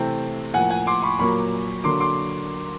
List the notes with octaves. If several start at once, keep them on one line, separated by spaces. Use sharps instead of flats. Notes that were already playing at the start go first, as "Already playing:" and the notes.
Already playing: C3 E3 A3 C4
A2 F3 A#3 F#5 G#5
F#5 G#5
C6 D6
B5 C#6
A#2 F#3 A#3 B5 C#6
D3 F#3 A#3 C6 D6
C6 D6